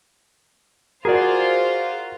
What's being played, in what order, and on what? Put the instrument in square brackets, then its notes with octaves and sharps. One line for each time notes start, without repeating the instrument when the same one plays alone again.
[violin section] F4 C5 [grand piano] F#4 A#4 [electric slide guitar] G#4 D5